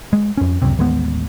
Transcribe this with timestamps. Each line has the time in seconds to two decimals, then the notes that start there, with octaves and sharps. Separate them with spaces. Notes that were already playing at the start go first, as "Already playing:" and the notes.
0.13 G#3
0.37 F2 C#4
0.62 C#2 F#2 C3
0.77 A1 D#2 G#3 B3